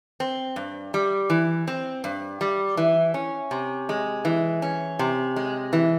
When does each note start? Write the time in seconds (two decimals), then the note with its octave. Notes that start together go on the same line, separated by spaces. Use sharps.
0.20 C4
0.56 G2
0.94 G3
1.30 E3
1.68 C4
2.04 G2
2.41 G3
2.77 E3
3.14 C#4
3.51 C3
3.89 G#3
4.25 E3
4.62 C#4
4.99 C3
5.36 G#3
5.73 E3